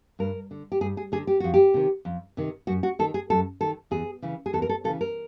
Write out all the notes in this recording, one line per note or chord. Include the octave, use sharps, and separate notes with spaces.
G2 A#4
D3
G4
G2 G#4
G#4
D3 G#4
G4
F2 F#4
G4
C3 D#3
F2
C3 D#3
F#2 F#4
F#4
D#3 A4
G#4
F#2 A4
D#3 A4
E2 G#4
C#3 E3
G#4
E2 A4
A#4
A4
C#3 E3 A4
A#4